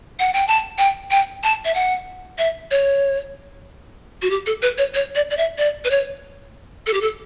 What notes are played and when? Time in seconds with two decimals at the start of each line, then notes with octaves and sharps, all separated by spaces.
0.19 F#5
0.34 G5
0.48 A5
0.78 G5
1.11 G5
1.43 A5
1.65 E5
1.75 F#5
2.38 E5
2.71 C#5
4.22 F#4
4.30 G4
4.46 A4
4.62 B4
4.78 C#5
4.94 C#5
5.15 D5
5.31 D5
5.37 E5
5.58 D5
5.85 B4
5.91 C#5
6.87 A4
6.93 G4
7.01 A4